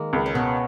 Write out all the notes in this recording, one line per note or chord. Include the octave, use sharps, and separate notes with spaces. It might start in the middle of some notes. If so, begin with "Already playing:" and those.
Already playing: D#3 G#3 A#3
C#2
C#4
B2 B3